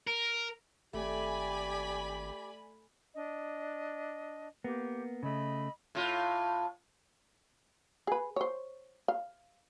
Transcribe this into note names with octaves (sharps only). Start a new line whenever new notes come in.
A#4
G#1 A3 G4 D5 G#5 B5 D6
D4 D#5
A#3 B3 G4
C#3 A3 D#5 B5 E6
A2 F4
G#4 B4
C5 C#5
F5